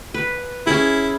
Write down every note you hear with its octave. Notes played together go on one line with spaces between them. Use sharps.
B4
C#4 E4 G#4